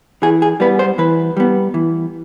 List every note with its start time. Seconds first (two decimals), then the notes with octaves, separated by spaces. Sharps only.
0.22 E3 G#4
0.42 G#4
0.60 G3 B3 B4
0.79 C5
0.98 E3 B4
1.37 G3 B3
1.74 E3